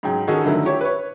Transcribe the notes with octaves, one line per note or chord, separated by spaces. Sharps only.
G#2 C#3 F#3 G5
D#3 C#4 D#4 F#4 G#4 A4
G2 D3 D#3 F#3 A3 E4
E4 G4 C#5
B4 C#5